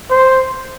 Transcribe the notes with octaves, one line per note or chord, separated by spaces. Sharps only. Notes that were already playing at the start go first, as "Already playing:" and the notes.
C5